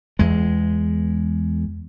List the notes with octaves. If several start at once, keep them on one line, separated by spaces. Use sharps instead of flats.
E2 G#3